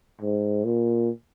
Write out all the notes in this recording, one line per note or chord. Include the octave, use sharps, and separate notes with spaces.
G#2
A#2